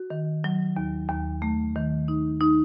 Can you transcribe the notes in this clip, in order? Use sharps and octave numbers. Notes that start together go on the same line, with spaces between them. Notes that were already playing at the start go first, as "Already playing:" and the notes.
Already playing: F#4
D#3
F#3
D#2
D#2
A3
D#3
D#4
D#4